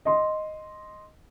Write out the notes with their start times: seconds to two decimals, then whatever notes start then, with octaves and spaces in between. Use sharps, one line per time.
0.05 D#5 C6